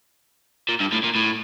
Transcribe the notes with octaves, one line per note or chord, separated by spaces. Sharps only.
A#2
G2
A2
A#2
A2